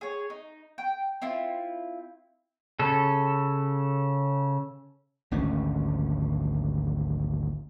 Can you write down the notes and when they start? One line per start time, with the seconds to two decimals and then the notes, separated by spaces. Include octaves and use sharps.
0.01 G#4 C#5
0.30 D#4
0.78 G5
1.22 C4 E4 F4
2.79 C#3 A4
5.31 G#1 D2 C#4